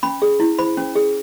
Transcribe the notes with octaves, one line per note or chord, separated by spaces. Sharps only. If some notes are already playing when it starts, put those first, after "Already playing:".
C#4 B5
G#4
E4
C5 B5
C#4
G#4